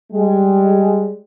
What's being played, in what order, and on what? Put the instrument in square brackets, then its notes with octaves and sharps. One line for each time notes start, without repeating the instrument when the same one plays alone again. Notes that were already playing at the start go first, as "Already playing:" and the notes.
[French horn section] G3 G#3